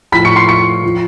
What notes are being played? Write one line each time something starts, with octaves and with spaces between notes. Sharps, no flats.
A2 F3 B5 B6
C#6 C#7
C6 C7
C#6 C#7
F3